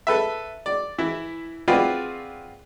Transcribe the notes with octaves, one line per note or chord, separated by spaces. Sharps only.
A4 B4 E5
D5
E3 E4
C4 F4 F#4 G#4 B4 D5